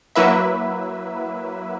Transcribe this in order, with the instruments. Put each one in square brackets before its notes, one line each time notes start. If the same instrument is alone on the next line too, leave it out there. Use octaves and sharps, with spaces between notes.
[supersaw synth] F#3 A#3 E4 B4 E5